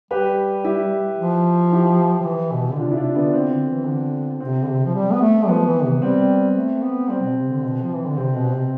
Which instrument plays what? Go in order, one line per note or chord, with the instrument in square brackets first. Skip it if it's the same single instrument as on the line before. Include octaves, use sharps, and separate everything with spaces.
[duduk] G3 [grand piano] G4 B4
[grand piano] E4 G4
[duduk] F3
[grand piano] E4 G4
[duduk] F3
E3
B2
D3
[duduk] C3 [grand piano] D4 F4
[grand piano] E4
[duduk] C3 [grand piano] D4 F4
[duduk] D3 [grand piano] B3 D4
[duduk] D3 [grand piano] C4
[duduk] D3
E3
D3
[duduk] C3 [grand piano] C4
[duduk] D3
C3
F3
G3
B3
A3
[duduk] F3 [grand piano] B3
[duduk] E3
C3
[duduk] G3 [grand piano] C4
[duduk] G3
A3
B3
[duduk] G3 [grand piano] C4
[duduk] B2
C3
D3
B2
F3
E3
D3
[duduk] C3 [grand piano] C4
[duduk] B2
[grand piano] C4
[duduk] C3